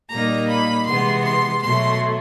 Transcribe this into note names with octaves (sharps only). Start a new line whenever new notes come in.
A#2 G3 A#3 D#4 A#5
B5
C3 E3 G#3 B3 C6
C6
B2 F#3 A3 C6